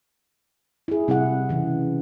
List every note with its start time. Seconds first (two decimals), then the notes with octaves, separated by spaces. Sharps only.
0.88 E4 G#4
1.08 C3 G3 E4 G#4 F#5
1.49 C#3 E3